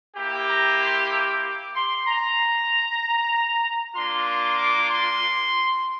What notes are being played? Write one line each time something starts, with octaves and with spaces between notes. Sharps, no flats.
A#3 E4 G4
A#5
C6
D6
D6
C6
A#5
A#3 D4 F4 C6
C6
D6
C6